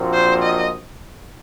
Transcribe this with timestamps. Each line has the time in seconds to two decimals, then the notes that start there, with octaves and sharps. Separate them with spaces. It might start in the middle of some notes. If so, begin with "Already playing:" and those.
Already playing: A#1 A#2 F3 C4 F#4
0.13 C5
0.42 D#5